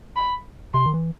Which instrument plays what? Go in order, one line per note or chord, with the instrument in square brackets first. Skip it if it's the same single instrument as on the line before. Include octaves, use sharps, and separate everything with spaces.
[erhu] B5
[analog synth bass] C3 [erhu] C6
[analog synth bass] D#3
E3